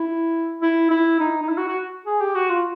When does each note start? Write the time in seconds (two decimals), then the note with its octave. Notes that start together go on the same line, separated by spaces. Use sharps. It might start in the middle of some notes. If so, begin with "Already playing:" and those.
Already playing: E4
0.62 E4
0.90 E4
1.20 D#4
1.43 D#4
1.48 E4
1.58 F#4
1.68 F#4
2.06 G#4
2.21 G4
2.35 F#4
2.50 F4